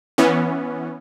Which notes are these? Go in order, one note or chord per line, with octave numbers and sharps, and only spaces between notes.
E3 B3 C#4